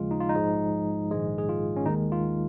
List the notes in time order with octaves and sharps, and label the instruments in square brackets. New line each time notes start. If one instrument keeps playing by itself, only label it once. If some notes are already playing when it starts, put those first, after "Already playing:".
Already playing: [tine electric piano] D#2 C#3 F3 G#3 F4
D#4
F4
D#4
A#1 G#2 F3 G#3
A#1 G#2 D#3 G#3
G#4
F4
C#4
D#2 D#3 G#3 D#4
F4